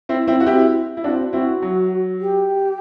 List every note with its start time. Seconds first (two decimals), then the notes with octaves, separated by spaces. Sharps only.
0.09 C4 E4
0.28 C4 E4
0.40 F#4
0.47 C4 E4 G4
0.97 E4
1.04 C4 D4 F#4
1.33 C4 E4 F#4
1.62 F#3
2.20 G4